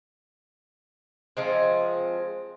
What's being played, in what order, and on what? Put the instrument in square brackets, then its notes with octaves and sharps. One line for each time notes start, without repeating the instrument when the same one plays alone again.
[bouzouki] F3 G#3 C4